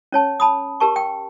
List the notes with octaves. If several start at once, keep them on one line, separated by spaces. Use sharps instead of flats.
C#4 C#5 A5
A5 B5 D#6
G4 A#4 A5 C#6
G5